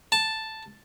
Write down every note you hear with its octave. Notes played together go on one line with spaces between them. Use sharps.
A5